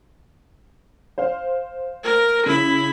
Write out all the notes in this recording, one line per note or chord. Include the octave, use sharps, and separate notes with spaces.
C5 F5
A#4
C#3 E4 B5